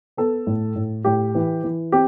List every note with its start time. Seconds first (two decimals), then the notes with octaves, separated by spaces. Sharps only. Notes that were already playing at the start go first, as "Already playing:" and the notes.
0.17 B3 A4
0.47 A2
0.76 A2
1.05 A2 G4
1.35 E3
1.64 E3
1.92 C4 G4